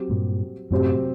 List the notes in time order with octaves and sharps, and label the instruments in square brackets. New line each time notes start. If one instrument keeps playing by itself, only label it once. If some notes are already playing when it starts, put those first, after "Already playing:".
Already playing: [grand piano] F#3 C4 G4
[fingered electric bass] G2 A#2
[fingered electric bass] F#2 A2 [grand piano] C3 F#3 C4 G4